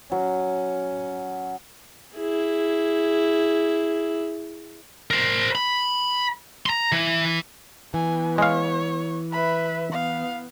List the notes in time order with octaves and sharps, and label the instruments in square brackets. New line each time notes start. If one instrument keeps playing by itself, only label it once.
[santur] F#3 [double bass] C#4
[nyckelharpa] E4 G#4
[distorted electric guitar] A#4 C5
B5
A#5 C6
E3
[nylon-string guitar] E3 [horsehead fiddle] B3 [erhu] G#5
[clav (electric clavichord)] G#3 F5 [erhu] C#5
[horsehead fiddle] B4 E5 [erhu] B5
[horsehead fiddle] B3 [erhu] F5